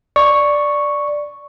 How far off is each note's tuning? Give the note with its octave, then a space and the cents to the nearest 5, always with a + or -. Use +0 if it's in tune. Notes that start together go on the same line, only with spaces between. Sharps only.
D5 +0 C#6 +0